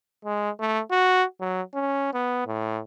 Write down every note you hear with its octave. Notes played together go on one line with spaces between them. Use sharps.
G#3
A3
F#4
F#3
C#4
B3
A2